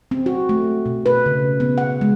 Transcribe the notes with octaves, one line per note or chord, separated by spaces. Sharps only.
C4
F#4
A3
B2
B4
C#3
B3
F#5
G#3